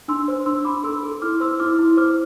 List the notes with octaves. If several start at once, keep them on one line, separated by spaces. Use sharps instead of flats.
D4 C6 E6
C5
D4 C6 E6
D4 B5 D6
A4 C6 E6
A4
E4 D6 F6
C5 C6 E6
E4 D6 F6
E4
C5 D6 F6